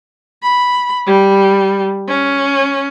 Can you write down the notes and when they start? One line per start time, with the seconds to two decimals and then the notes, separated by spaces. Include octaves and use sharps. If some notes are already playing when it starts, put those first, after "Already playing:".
0.43 B5
1.07 G3
2.08 C#4